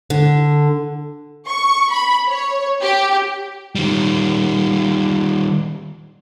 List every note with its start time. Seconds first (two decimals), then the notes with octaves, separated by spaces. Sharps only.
0.10 D3
1.48 C#6
1.92 B5
2.29 C#5
2.81 G4
3.75 D#3 G3